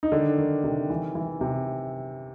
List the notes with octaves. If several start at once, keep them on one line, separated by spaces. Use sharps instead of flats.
D#4
D3 D#3 D4
D#3
C3
E3
E3
C3